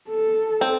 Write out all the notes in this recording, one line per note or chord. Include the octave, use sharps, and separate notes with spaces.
A4
C4